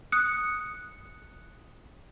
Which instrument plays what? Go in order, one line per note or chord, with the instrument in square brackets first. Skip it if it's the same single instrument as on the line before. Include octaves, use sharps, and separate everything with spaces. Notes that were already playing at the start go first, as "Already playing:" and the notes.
[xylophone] D#6 F#6 C#7